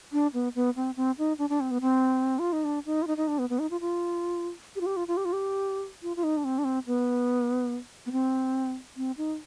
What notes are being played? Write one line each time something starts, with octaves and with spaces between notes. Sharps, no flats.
D4
B3
B3
C4
C4
D#4
D4
D4
C4
B3
C4
F4
D#4
D4
D#4
F4
D#4
D#4
D4
B3
B3
D#4
F4
F4
G4
F4
G4
F4
F4
G4
F4
G4
F4
F4
D#4
D4
C4
D4
C4
B3
B3
C4
C4
D#4